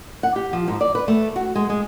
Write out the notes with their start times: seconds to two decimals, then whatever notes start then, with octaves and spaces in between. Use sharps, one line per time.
0.23 F#5
0.36 G4
0.53 F3
0.68 G#2
0.81 D5
0.95 B4
1.08 A3
1.36 F#4
1.55 G#3
1.70 G#3